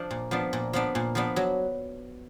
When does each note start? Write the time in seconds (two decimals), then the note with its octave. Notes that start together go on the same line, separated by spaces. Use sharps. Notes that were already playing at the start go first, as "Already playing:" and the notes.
Already playing: F3 D4
0.11 A#2
0.31 F3 B3 D4
0.53 A#2
0.73 F3 B3 D4
0.95 A#2
1.15 F3 B3 D4
1.36 F#3